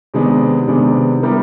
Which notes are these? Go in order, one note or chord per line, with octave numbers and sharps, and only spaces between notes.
C3 D#3 G#3 B3 D4
C3 D#3 G#3 B3 D4
G3 B3 E4 G4 A#4